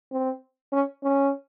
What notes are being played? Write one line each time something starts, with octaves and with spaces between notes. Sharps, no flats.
C4
C#4
C#4